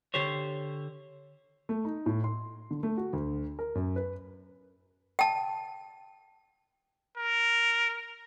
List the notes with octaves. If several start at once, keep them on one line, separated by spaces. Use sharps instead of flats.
D3 G4 C5 C#5
A3
D#4
A2
C6
D3
A3
F#4
D2
A#4
F#2
B4
G5 A5
A#4